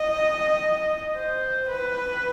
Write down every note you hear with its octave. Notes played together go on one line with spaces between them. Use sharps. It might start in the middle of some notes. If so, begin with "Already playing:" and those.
Already playing: D#5
C5
B4